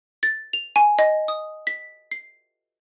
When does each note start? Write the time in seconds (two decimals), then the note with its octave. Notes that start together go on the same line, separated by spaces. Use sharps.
0.23 A6
0.53 F7
0.76 G#5
0.99 D#5
1.28 D#6
1.67 B6
2.11 C7